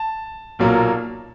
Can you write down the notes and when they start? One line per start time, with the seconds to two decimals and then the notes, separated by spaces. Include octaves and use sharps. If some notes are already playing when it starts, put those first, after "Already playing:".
Already playing: A5
0.59 B1 A#2 F#3 A#3